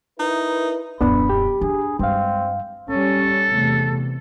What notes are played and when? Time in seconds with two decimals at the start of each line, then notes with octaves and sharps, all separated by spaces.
0.19 D#4 E4 A#4 B4
1.01 D#1 F#2 B3 D4 B5
1.29 G4
1.61 D4 G#4
1.99 G2 G#3 C4 F5
2.90 G3 C#4 A4
3.48 E2 C3 A3